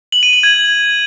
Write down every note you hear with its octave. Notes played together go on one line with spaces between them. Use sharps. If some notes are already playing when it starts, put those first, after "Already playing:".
F#7
D#7
F#7
G#6